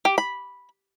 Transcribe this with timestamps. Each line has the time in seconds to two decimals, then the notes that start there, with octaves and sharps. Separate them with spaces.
0.05 G4
0.18 B5